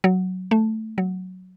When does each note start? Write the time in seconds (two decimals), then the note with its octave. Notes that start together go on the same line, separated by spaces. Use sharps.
0.04 F#3
0.51 A3
0.98 F#3